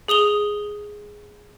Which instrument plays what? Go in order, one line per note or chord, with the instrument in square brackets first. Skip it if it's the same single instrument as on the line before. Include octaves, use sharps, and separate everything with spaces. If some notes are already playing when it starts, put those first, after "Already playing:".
[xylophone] G#4 D#6 F7 G7